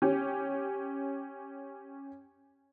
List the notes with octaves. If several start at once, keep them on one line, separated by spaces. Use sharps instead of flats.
C#4 G4